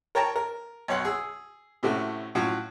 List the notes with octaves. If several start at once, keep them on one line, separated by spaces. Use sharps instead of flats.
A#4 C#5 G5 A5 A#5
A#4
B1 C#5 F#5 C6
G#4 E6
A2 C3 A3 C#4 F#4
A2 F#3 C#4 F4 F#4